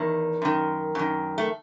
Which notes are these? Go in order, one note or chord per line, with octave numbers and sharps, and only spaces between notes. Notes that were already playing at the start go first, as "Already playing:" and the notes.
Already playing: E2 D#3
F#2 D#3
F#2 D#3
A3